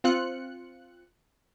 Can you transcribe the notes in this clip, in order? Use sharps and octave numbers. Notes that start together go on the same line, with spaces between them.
C4 F4 F#6 C#7